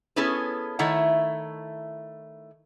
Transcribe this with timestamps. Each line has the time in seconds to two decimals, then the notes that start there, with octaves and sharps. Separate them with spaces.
0.16 B3 C#4 E4 G#4 A4 B4
0.79 D#3 A3 E4 C#5 E5 F#5